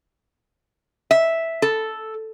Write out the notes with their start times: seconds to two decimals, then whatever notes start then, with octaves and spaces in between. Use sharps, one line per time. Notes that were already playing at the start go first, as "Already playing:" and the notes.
1.11 E5
1.62 A4